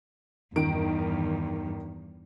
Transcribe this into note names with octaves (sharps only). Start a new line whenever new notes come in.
E2 G2 D#3 D7